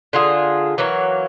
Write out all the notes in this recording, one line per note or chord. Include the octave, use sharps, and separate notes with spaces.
D3 F4 G#4
E3 F#3 A#3 C#5